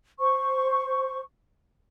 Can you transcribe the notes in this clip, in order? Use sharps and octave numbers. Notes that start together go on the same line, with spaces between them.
C5 C#6